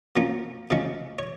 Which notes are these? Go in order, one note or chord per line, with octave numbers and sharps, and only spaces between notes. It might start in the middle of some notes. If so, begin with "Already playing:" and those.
F3 A#3 C#4 F4
C#3 F3 G#3 C#4
C#5